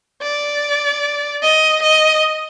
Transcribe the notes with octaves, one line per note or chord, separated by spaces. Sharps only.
D5
D#5
D#5